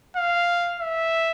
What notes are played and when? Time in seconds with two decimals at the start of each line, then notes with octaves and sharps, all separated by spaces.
0.16 F5
0.80 E5